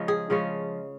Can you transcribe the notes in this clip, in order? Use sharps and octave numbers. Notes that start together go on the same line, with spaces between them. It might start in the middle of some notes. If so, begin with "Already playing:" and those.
Already playing: C#3 F3 G#3 C#4
G#4
C#3 F3 G#3 C#4